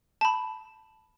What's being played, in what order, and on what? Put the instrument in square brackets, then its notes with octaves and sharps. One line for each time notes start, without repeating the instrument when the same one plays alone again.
[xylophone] A5 B5